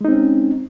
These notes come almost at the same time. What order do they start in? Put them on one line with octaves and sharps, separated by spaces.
G#3 D#4 C4 C#4